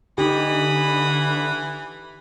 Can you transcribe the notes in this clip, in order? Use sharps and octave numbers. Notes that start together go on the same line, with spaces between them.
D3 E3 D#4 G4 B5 D#6